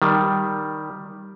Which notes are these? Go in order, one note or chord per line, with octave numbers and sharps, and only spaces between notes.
D#3 G3